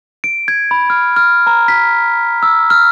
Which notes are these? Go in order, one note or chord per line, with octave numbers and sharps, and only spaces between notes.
D7
G#6
B5
F6
F6
A#5
B6
E6
F6